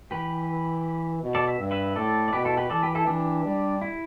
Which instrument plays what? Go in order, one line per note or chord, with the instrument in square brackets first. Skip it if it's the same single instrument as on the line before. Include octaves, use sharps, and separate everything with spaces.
[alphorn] E3 [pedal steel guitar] G4 B4
[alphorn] B2
[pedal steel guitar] A4 D5
E5
[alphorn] G2
[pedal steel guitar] B4 E5
[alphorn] A2 [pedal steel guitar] A4 D5
[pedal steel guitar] D5
[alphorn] B2 [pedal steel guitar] G4 B4
[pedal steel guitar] E4 A4
G4 B4
[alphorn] E3 [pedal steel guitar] A4 D5
[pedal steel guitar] G4 B4
E4 A4
[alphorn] E3 [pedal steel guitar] D4 G4
[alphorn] G3
[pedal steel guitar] E4